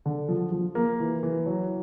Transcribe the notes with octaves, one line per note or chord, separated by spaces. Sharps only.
D3
F3
F3
A#3
E3
E3
F#3